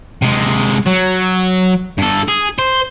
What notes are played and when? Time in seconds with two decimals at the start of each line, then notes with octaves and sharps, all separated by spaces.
0.22 C3 G#3
0.87 F#3
1.98 G2 A4
2.28 G#4
2.59 C5